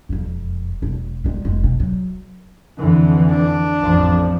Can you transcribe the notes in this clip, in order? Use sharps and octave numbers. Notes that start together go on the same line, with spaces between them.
E1 F2
E1
G3 G#3
F1 G#3
B2
F#3
F2 D3 E3
D4
A1 F2 F3